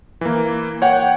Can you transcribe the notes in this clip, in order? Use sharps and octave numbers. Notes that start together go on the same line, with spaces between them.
E3 A#3
C#5 F#5 G5